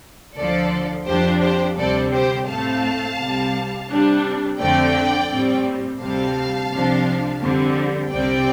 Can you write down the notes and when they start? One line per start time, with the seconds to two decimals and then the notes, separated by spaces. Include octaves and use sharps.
0.36 D2 D3 F3 A4 D5
1.06 F2 F3 D4 G4 C5
1.43 G4 C5
1.77 D2 C3 G3 C4 A4 D5
2.13 G4 C5
2.48 A2 A3 C4 F5 A5
3.18 C2 C3 G3
3.89 C3 G3 D4
4.59 F2 D3 A3 C4 D5 G5
5.30 A2 G3 C4
6.00 D2 C3 G3 C4 F5 A5
6.71 C2 C3 F3 D4
7.41 F2 D3 G3 C4
8.12 C2 C3 G3 C4 D5 G5